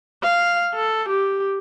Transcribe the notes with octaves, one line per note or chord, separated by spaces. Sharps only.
F5
A4
G4